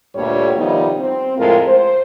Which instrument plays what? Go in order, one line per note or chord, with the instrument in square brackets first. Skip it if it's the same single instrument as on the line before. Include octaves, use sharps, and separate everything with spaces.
[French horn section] D2 G2 A#2 D3 G3 C#5
C3 D#3 F3 G3 B3 D#4
C4
F2 A2 G#3 F4 A#4
C5